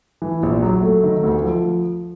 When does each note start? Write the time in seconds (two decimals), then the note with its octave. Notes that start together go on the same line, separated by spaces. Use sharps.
0.22 E3
0.43 A#1
0.62 F#3
0.82 A3
1.03 D#3
1.23 D2
1.44 F3